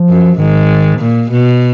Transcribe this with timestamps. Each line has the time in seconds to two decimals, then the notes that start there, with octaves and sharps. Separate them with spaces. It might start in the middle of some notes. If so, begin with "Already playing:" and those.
Already playing: F3
0.09 F#2
0.38 G#2 D#3
0.99 A#2
1.30 B2